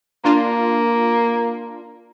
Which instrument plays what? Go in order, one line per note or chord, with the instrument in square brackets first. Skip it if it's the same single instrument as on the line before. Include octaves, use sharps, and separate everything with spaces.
[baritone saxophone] A#3 [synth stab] D4 F4 A#4